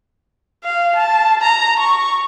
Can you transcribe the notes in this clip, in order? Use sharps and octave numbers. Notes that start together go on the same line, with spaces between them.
F5
A5
A#5
C#6